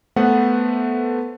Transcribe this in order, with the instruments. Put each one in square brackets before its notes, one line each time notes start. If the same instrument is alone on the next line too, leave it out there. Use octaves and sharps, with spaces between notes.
[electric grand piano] A3 B3 B4 C5 F#5